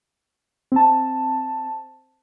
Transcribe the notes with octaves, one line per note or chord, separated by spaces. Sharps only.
C4 A5